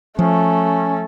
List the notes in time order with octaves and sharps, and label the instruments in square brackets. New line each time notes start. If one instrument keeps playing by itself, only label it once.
[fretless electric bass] F3 [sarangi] A3 [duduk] C#4